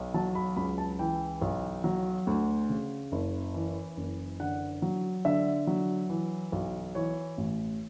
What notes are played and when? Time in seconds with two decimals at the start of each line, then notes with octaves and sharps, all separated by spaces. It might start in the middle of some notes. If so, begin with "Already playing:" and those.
Already playing: B1
0.14 F#3 A5
0.35 B5
0.57 C#2 B5
0.78 A5
0.99 E3 G5
1.42 B1
1.84 F#3
2.27 D2
2.69 C#3
3.12 F#1
3.54 E3
3.97 F#1
4.40 D3 F#5
4.82 F#3
5.25 D3 E5
5.67 F#3
6.10 E3
6.52 B1
6.95 E3 C#5
7.38 A1